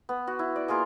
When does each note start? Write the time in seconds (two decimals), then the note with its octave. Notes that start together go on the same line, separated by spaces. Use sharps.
0.09 B3
0.27 F#4
0.39 E4
0.56 D5
0.68 A#3 F4 G#4 D6